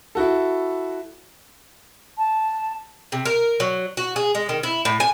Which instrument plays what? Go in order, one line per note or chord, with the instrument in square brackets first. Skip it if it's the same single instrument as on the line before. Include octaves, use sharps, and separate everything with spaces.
[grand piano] E4 F#4 A4
[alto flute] A5
[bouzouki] C3
A#4
F#3
F#4
G#4
G#3
D#3
E4
A2
G#5